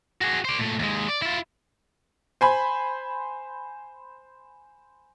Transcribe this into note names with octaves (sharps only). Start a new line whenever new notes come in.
F#4 G#4
C5 D5
A#2 A3
D#2 G#3
D5
E4 F4
C5 G#5 B5